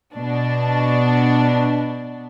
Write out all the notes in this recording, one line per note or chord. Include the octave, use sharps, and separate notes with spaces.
B2 D4